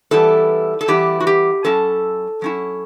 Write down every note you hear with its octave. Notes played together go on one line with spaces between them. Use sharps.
E3 G3 B3 E4 A4
A4
E3 G3 B3 E4 G4
F#4
G4
F#3 C#4 E4 A4
F#3 C#4 E4